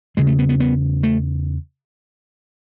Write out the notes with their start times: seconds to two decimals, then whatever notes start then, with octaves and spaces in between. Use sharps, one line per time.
0.17 E2 C#3 G#3
0.27 A3
0.39 B3
0.49 B3
0.60 B3
1.03 A3